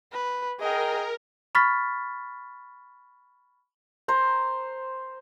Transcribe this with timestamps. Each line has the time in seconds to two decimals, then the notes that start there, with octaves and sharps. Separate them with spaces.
0.13 B4
0.60 G#4 A#4 D#5 G5
1.55 B5 C#6 F6 A6 B6
4.08 C5 A#5